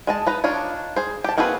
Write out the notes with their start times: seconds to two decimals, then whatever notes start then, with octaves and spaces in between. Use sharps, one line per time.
0.07 G#3 D#5 A5
0.27 D#4 B4 A#5
0.44 D4 D#4 F4 C#5
0.96 G#4 C5
1.24 G4 A5
1.37 A#3 C4 F#4 G#4 B4